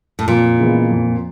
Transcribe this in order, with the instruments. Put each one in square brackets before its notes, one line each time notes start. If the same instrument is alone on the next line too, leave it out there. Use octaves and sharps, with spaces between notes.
[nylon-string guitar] A2
[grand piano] F2 [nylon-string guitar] A#2
[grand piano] C#3 E3 G#3 B3
F2